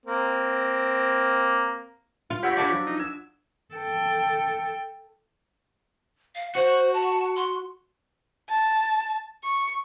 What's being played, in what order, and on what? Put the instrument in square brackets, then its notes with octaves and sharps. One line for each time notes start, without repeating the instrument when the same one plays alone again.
[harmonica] A#3 C4
[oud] F4
[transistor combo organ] G4 C#5 B5 [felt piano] F#5 E6 A#6
[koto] D4 F#4 D5 [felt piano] F5 A5 B6
[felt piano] F3 F#3
[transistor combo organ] D#4
[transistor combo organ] E6 [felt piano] G#6
[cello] A4 G5
[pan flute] F5
[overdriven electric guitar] F#4 [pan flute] C5
[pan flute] A5
C6
[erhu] A5
C#6